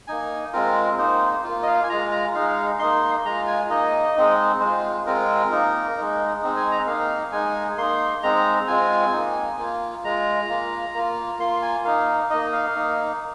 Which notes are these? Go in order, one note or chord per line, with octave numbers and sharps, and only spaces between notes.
A#3 D#4 G#5
G#3 C4 F4 A#4
A#3 D#4 C5
A#3 F4
D#5
F5
G#5
G#3 F4 A#5
A#5
G#3 D#4 F5
A#3 D#4 C6
G#3 F4 A#5
G#5
A#3 D#4 D#5
G#3 C4 D#4
G#3 F4 C5
G#3 C4 F4 A#4
A#3 D#4
G#3 D#4
G#3 C4 D#4
G#5
A#5
A#3 D#4 F5
G#3 D#4 G#5
A#3 D#4 C6
G#3 C4 D#4 A#5
G#3 C4 F4 G#5
A#3 D#4
A#3 F4
G#3 F4 A#5
A#3 F4
A#3 F4
A#3 F4 C6
G#5
A#3 D#4 F5
A#3 D#4 D#5
F5
A#3 D#4